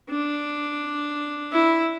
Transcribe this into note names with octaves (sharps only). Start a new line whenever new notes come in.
D4
E4